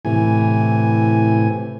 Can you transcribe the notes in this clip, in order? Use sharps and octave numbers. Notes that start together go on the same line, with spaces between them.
A2 C3 E3 G#5